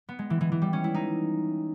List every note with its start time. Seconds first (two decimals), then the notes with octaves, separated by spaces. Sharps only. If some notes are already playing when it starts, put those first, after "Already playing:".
0.09 B3
0.19 G#3
0.30 E3
0.41 E3
0.52 E3
0.62 G3
0.73 C#4
0.84 E4
0.94 D#4